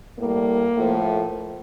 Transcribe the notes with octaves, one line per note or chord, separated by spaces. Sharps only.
A2 G3 A#3
A2 F3 A3